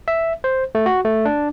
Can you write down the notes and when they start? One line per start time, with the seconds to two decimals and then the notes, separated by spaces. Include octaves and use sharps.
0.08 E5
0.44 C5
0.75 A3
0.86 F#4
1.05 A3
1.25 D4